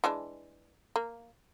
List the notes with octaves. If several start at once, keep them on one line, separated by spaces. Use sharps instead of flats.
E3 G#3 D4
A#3